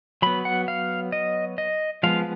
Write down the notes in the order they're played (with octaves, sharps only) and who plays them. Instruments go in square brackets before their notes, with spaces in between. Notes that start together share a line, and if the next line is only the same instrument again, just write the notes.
[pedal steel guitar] F#3 B3 B5
F#5
F5
D#5
D#5
F3 G#3 B3 F5